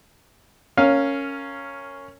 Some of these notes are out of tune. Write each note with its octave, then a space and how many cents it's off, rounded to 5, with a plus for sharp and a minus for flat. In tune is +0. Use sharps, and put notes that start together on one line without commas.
C#4 +0 A#4 -20 F5 +0